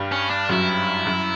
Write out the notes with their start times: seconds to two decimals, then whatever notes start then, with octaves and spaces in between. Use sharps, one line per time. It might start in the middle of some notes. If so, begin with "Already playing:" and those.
Already playing: G2 G3
0.12 C#4
0.30 D4
0.49 F#2 F#3 E4
1.06 F#2 F#3